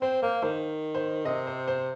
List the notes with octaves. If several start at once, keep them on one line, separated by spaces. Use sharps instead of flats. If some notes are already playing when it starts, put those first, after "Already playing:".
C4 C5
A#3 C5
D#3 C5
C5
C3 D#5
C5
C5